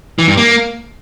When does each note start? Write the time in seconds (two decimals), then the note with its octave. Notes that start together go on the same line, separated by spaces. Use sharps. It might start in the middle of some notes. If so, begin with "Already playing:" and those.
0.19 E3
0.28 G2
0.37 A#3